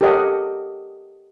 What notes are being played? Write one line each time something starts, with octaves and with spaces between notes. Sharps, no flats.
G4 A4 A#4 C#5 D#5 F#5